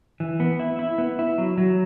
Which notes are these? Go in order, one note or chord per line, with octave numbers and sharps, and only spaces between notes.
E3
B3
E4
E4
B3
E4
F#3
F#3